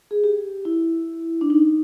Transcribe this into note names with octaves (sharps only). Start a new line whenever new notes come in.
G#4
G4
E4
D4
D#4